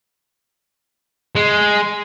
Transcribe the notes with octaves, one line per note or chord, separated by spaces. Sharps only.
G#3